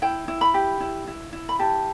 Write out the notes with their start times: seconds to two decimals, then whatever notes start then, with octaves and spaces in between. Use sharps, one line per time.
0.02 E4 G5
0.28 E4
0.41 B5
0.54 G4
0.80 E4
1.07 E4
1.33 E4
1.49 B5
1.59 G4 A5